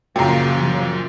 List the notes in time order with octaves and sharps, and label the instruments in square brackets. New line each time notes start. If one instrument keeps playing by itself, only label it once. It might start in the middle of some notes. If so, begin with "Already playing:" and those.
[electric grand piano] F#2 A#2 [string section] C#3 F3 [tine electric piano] F#3 C7 [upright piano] G5 A#5